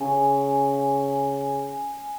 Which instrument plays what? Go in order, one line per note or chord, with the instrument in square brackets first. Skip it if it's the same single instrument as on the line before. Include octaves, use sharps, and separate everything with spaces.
[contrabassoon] C#3 [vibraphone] G#5